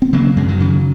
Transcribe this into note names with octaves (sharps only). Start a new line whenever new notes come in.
C4
C#3 F#3 A#3
F#2 G#3
D#3 F#3
C#3